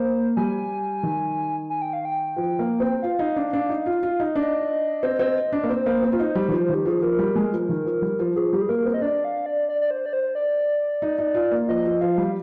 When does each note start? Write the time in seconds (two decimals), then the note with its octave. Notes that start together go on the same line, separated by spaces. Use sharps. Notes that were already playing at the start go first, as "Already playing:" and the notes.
Already playing: A#3 C5
0.37 G3 G#5
1.03 D#3
1.70 G#5
1.82 G5
1.93 F5
2.05 G5
2.36 F3
2.59 A#3
2.80 C4
3.02 F4 F5
3.19 D#4
3.36 D4
3.53 D4
3.69 D#4
3.86 F4
4.03 F4
4.20 D#4
4.36 D4 D#5
5.03 C4
5.19 C4
5.53 D4
5.64 A#3
5.69 C4 C5
5.86 A#3
6.03 C4
6.12 F4
6.19 D#4
6.35 G3
6.48 D#3
6.52 F3
6.69 D#3
6.74 G4
6.86 F3 G#4
7.02 F3 A#4
7.19 G3
7.36 G#3
7.53 F3
7.69 D#3
7.85 F3
8.02 G3
8.19 F3
8.36 F3 G#4
8.53 G3 G4
8.61 G#4
8.69 A#3 A#4
8.86 C4
8.94 D#5
9.02 D4 D5
9.25 F5
9.46 D5
9.69 D5
9.81 D5
9.91 C5
10.06 D5
10.13 C5
10.35 D5
11.02 D#4
11.18 D#4
11.35 F4
11.51 A#3
11.68 F3 D#5
11.85 F3
12.01 F3 F5
12.18 G3